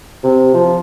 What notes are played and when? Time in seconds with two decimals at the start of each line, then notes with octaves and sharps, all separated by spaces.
0.24 C3
0.54 F3